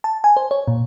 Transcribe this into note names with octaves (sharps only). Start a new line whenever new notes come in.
A5
G#5
C5
C#5
A#2